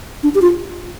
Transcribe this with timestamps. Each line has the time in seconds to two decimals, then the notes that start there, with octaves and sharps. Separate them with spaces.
0.23 D4
0.35 G4
0.42 F4